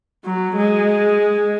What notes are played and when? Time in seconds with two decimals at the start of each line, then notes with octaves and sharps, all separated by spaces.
0.24 F#3
0.56 G#3